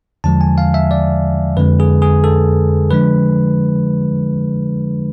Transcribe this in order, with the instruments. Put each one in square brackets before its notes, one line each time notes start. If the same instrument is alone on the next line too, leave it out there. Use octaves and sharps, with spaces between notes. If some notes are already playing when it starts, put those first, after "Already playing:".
[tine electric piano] E2 D3 F3 G#3 A5
G#5
F5
E5
D5
F2 D3 G#3 B4
G#4
G#4
A4
D3 F3 G#3 D4 B4